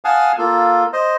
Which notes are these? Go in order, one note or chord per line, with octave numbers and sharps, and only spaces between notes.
F5 F#5 G#5 A5 D#6
A#3 F4 A4
C5 D#5